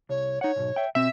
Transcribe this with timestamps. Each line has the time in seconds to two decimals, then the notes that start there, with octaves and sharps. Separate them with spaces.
0.09 C2 C#5
0.41 D#4 C#5 F#5
0.56 B1 E2 G#2
0.76 E5 G5
0.95 B2 C4 E5